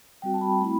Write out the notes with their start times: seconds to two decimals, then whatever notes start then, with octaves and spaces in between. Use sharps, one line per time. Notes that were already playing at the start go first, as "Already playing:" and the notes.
0.22 G3 C4 F#4 G5
0.34 A5
0.41 B5
0.60 A3 C4 E4 B5